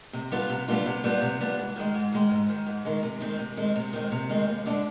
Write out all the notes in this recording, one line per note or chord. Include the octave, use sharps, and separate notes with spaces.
C3
G3 B3 D4 F4
C3
G3 B3 D4 F4
C3
G3 B3 D4 F4
C3
G3 B3 D4 F4
G#2
D#3 G#3
G#2
D#3 G#3
G#2
D#3 G#3
G#2
D#3 G#3
C3
D#3 G#3 C4
C3
D#3 G#3 C4
C3
D#3 G#3 C4
C3
D#3 G#3 C4
D#2
D3 G#3 D4